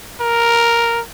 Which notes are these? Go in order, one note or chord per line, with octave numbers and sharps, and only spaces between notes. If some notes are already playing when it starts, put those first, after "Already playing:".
A#4